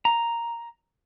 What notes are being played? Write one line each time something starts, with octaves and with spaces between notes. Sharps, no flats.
A#5